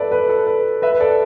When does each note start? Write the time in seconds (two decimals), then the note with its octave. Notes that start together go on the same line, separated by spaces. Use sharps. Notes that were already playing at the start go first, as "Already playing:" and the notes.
Already playing: A4 B4 D5 E5
0.11 B4
0.29 A4
0.47 B4
0.82 B4 E5
0.92 B4
1.00 A4 D5